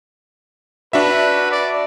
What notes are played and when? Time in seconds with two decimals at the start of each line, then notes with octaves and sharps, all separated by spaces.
0.93 D4 F#4 B4 E5
1.51 D5